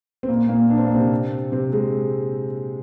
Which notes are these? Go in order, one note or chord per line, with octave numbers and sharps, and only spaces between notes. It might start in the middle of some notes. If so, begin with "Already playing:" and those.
C4
A#2 A#3
A#2 A#3
D4
C4
A#3
C3 C4
C3 C4
G#3